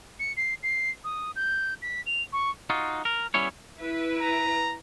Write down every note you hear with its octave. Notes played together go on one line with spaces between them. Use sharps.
C#7
C7
C7
D#6
G6
B6
F7
C#6
D#4 F4 F#4
A#4
G3 B3 C#4 E4 C#5
E4 B4
A#5